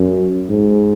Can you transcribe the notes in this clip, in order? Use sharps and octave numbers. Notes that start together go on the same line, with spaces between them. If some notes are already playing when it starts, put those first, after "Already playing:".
Already playing: F#2
G#2